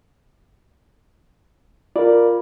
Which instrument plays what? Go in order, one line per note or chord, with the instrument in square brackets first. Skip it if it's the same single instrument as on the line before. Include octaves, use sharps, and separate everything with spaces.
[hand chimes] F4 [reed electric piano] A#4 D5